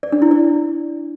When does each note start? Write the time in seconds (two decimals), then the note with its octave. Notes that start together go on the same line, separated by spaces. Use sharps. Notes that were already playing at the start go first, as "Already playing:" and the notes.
0.03 D5
0.12 D4
0.22 E4
0.31 D5